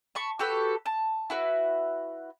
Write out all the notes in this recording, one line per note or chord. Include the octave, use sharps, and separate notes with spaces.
A5 B5 C#6
F#4 G4 A4 B4
A5
E4 F#4 B4